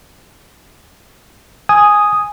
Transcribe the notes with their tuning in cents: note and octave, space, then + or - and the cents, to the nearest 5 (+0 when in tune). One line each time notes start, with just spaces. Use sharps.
G#5 +0 D#6 +0